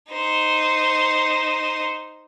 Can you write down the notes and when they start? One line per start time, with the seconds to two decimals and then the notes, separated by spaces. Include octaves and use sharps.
0.12 D#4 C5